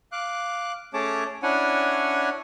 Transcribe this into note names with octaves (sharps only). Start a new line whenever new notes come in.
F5 D6 F#6
A3 C#4 G#4 C#5 A5 D6
C#4 D4 E4 C#5 F#5 G#5